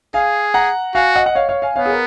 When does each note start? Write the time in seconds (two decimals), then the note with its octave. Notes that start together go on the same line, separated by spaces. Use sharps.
0.14 G#4 F5 G#5
0.54 F#5 A#5
0.95 F#4 F5 G#5
1.16 D#5 F#5
1.26 F#5
1.35 C#5 F5
1.49 C#5 F5
1.62 F5 G#5
1.76 B3 C#5 F5
1.85 G#4
1.90 A#4